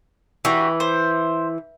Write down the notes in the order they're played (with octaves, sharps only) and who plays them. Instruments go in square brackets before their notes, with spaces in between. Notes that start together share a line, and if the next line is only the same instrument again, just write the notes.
[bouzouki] E3 [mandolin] D4 F#4 G4
[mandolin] C5